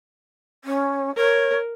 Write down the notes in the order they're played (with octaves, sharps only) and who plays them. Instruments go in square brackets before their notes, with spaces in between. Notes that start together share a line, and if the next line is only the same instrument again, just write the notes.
[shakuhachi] C#4
[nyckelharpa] A#4 [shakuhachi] C#5